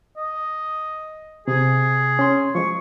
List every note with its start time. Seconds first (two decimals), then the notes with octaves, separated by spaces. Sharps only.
0.17 D#5
1.48 C3 G#4
2.19 C#4 C6
2.55 F3 G#3 C#6